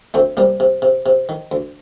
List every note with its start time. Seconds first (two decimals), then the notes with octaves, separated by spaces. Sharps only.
0.14 D2 A3 C4
0.37 C3 G3 A#3
0.60 C3
0.82 C3
1.06 C3
1.29 D#3
1.51 D2